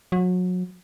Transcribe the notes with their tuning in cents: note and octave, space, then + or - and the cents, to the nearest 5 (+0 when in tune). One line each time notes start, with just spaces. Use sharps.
F#3 -30